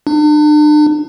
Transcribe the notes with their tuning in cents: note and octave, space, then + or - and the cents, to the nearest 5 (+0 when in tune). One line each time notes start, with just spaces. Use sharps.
D4 +40